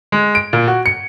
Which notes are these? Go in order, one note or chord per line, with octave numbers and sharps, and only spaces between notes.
G#3
D7
A#2
F#4
C#7